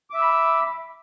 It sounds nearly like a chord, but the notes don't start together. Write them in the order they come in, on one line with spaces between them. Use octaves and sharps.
D6 E5 E6 B5